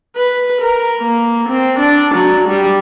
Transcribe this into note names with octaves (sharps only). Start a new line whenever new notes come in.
B4
A#4
A#3
C4
D4
F#3
G3